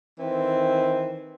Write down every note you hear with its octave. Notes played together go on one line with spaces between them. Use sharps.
D#3 E3 C4